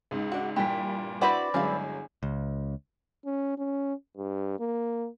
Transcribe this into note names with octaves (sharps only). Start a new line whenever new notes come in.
C#2 G#2
D4 F#4
G2 A#2 E3 G4 B6
C4 D4 E4 F#4 B4 C5 D5
G1 F#3 G#3 C#4 E4 F5
C#2
C#4
C#4
G2
A#3